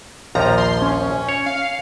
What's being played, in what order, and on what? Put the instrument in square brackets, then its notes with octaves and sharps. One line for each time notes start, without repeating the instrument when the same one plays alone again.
[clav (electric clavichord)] A#1 D#2 F3 [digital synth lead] A#5
[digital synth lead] C6
C#4
[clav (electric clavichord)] C#5
[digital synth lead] F5